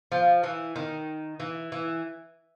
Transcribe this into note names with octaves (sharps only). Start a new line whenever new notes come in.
F3
E3
D#3
E3
E3